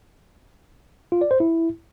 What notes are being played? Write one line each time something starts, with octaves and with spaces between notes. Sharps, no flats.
F4
D5
C5
E4